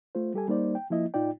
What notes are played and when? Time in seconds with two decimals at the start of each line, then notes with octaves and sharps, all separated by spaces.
0.15 A3 F4 C5
0.34 G3 G4 A4 G#5
0.48 G3 A#3 D#4 C5 D5
0.75 G5
0.90 F3 A#3 E4 D#5
1.14 A2 D#4 F4 D5 G5